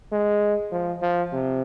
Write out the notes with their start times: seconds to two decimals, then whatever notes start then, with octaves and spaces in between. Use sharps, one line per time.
0.12 G#3
0.72 F3
1.02 F3
1.33 C3